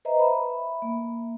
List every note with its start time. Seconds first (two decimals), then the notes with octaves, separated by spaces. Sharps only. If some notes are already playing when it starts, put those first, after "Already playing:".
0.05 B4 C5 D#5 E5 A#5
0.19 E5 B5
0.82 A#3